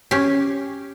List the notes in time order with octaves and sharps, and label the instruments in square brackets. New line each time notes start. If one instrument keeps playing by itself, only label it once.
[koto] C#4 G4